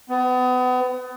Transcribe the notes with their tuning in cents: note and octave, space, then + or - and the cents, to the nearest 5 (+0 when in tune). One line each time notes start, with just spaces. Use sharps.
B3 +35